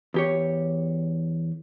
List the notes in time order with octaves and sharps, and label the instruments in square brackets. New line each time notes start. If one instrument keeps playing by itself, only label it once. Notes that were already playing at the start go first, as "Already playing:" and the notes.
[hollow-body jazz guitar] E2 G4 C#5